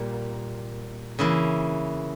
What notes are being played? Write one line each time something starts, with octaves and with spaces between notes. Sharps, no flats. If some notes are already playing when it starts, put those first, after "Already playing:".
Already playing: A#2 G3 A#3
C#3 E3 A#3 E4